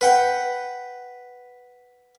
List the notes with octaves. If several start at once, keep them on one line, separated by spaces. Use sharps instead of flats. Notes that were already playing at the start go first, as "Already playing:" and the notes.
B4 F#5 G5